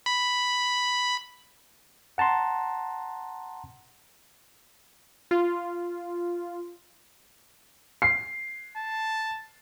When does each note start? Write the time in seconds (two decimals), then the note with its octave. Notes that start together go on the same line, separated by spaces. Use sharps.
0.06 B5
2.18 F#5 A5 A#5 C6
5.31 F4
8.02 C7
8.77 A5